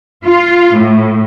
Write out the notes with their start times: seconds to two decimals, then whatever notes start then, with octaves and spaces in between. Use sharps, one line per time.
0.24 F4
0.76 A2